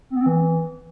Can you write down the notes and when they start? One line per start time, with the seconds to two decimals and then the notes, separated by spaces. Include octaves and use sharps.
0.10 C4
0.16 B3
0.21 C4
0.26 E3